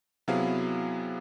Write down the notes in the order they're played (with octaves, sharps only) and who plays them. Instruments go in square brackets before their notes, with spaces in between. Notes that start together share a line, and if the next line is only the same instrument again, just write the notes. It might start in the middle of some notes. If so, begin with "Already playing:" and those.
[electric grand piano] C3 F#3 B3 E4 G#4 F5